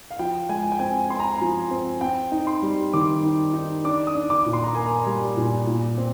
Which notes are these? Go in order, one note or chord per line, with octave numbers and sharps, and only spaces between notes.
F5
F3 G5
G#3 G#5
G5
C4 G#5
C4 C6
A#5
G#5
F3 A#5
C4
C4 G5
D#4
C6
G3
D#3 D6
D#4
D#4
D4 D6
D#6
D4
D6
A#2
C6
A#5
A#3 G#5
A#5
G3
A#2
A#2
C4